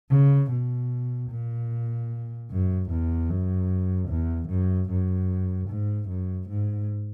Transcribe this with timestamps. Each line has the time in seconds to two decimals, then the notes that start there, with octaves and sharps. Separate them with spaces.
0.10 C#3
0.51 B2
1.30 A#2
2.50 F#2
2.90 E2
3.30 F#2
4.09 E2
4.49 F#2
4.89 F#2
5.69 G#2
6.09 F#2
6.49 G#2